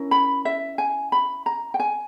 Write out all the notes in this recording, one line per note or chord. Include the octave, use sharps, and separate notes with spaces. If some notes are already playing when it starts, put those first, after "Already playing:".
Already playing: C#4 E4 A#4
B5
E5
G#5
B5
A#5
G5
G#5